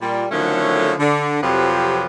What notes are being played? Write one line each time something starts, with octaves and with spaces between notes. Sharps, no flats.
A#2 G3
D3 D#3 F3 F#3 A3 C#4
D3
F2 C3 F3 F#3 G4 B4